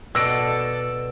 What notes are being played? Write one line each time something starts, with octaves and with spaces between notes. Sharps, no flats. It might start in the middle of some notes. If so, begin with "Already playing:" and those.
B2 A4 D5 E6 A#6 D7